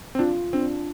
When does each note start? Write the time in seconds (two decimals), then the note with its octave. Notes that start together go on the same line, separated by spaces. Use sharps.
0.15 C4
0.19 D4 F4
0.53 C4 D4